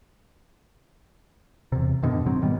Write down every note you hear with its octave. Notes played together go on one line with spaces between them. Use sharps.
E2 C3
F#2 B2 D3 D#3
G#2 D#3 F#3 C4
G2 D#3 G3 B3